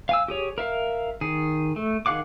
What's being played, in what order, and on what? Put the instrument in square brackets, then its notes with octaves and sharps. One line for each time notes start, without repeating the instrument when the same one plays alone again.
[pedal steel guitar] F5 G#5 E6
G4 G#4 C#5
A#4 E5 F5
D#3 G#4
A3
D#3 G#4 F5 F#5 D6